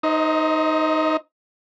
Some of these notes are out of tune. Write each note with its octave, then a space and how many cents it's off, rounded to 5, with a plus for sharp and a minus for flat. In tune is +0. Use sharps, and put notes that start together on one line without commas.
D#4 +0 C5 +0 D#5 +35